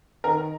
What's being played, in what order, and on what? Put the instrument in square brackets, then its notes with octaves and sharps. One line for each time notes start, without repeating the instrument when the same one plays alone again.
[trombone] D#3 [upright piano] A#4